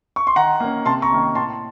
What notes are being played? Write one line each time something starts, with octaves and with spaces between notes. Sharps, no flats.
C#6
C6
D#3 F#5 A#5
A#3 C#4
C3 A5 C6
A#5 C#6
D#3 A#3 C#4
A2 A5 C6